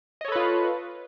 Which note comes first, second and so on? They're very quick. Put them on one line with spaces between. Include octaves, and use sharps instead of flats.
D#5 C#5 A4 B4 F4